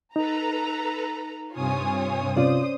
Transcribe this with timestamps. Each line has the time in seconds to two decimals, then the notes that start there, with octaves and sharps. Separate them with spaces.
0.16 D#4 A4 B4 A#5
1.54 G2 C3 F4 C#5 G#5 D#6
2.36 C3 C#4 F4 C5 D5 D#6